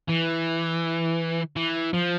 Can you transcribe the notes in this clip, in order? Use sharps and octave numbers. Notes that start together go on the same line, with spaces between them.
E3
E3
F3